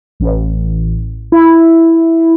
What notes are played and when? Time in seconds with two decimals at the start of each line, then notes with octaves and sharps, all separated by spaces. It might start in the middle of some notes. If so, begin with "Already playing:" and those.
0.20 A1
1.32 E4